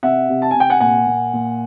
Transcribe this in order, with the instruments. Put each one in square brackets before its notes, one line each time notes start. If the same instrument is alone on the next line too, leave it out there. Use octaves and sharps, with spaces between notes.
[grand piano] C3 E5 F#5
C3
A5
C3 G#5
G5
F#5 G#5
A#2 F#5 G#5
A#2
A#2